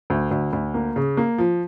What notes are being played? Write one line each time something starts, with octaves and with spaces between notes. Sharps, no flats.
D2
D2
D2
A#3
C#3
A#3
F3